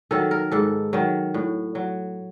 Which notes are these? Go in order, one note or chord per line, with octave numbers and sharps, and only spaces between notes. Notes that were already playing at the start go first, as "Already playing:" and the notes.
D#3 F#3 A4
A#4
G#2 A4
D#3 F#3
A2
F#3